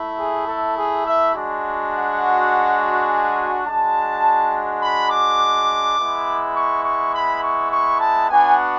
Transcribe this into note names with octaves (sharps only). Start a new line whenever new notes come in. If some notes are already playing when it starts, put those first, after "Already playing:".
Already playing: A3 E4
G#4
A4
G#4
E5
G#3 D4 F#4
F#5
G#5
G#3 D4 F#4 A5
B5
D6
G#3 B3 E4
C#6
C#6
B5
C#6
C#6
A5
B3 D4 F#4 G#5